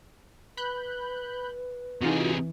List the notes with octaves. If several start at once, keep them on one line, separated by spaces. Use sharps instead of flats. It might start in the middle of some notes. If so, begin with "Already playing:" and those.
B4 B5 F#6 G6
C3 E3 D#4 F4 F#4 G#4